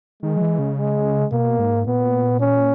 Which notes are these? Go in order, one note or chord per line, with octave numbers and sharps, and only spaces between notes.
D#3 G#3
F#3
E3
C#3
G#3
B2 A#3
G#2
A#2 B3
C#4